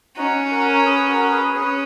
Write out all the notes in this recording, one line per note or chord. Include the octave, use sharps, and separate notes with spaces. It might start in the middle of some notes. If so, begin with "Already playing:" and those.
C#4 D#4 F#4
F#4 A#4
A#4 C#5
G#4 B4
F#4 A#4
A#4
G#4 B4
C#4 G#4 B4